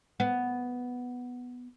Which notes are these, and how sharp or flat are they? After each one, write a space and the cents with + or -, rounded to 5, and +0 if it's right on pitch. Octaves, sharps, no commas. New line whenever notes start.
B3 +0